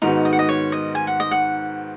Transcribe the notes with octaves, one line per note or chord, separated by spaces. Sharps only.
G#2 D#3 B3 D#4 F#4
D#5
F#5
D#5
C#5
D#5
G#5
F#5
D#5
F#5